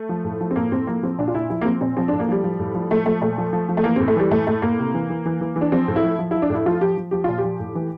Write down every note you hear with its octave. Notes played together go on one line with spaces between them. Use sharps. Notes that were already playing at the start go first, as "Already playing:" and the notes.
Already playing: A3
F3
A2
F3
C4
A2 A#3
A2 C4
F3 A#3
F3 C4
A#2 D4
F4
A#2 E4
F3 E4
A#3
F3 C4
A#2 C4
F3 C4
A2 D4
A#3
F3 G3
F3
A2
F3
F3 A3
F3 A3
A#2 A3
F3
F3
F3
A3
E3 A#3
A2 C4
A3
E3 G3
A2 A3
A2 A3
A2 A#3
C3
E3
E3
E3
E3
E3
D4
F3 C4
A2
E4
F3
F3
F3 E4
D4
A2 E4
F3 F4
F3 G4
F3
F3 G4
A#2 F4
G4
F3
A2
E3